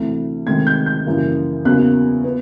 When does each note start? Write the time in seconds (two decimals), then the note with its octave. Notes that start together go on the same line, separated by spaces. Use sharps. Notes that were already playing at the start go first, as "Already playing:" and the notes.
Already playing: D2 C3 E3
0.47 D2 C3 D#3 G#3 G#6
0.67 G6
0.86 G6
1.06 F#2 C#3 E3 G3 A#3
1.65 E2 C#3 F#3 A#3 F#6
2.24 B3